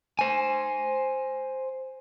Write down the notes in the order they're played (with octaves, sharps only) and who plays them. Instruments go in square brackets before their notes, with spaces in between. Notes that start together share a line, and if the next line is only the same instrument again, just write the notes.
[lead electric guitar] C5 G#5